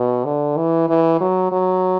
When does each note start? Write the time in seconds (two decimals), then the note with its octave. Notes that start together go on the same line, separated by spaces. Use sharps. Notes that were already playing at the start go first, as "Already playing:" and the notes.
Already playing: B2
0.25 D3
0.57 E3
0.89 E3
1.21 F#3
1.52 F#3